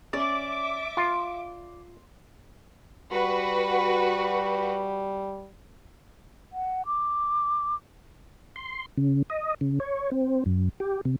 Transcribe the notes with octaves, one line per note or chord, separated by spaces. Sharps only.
C#4 D5 E5 D6
F4 C6
G3 F#4 B4
F#5
D6
C6
C#3
D#5
C#3
C#5
C4
F#2
G4
C3